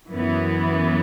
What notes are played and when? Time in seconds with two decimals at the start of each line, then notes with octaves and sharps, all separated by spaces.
0.11 F#2 E3 B3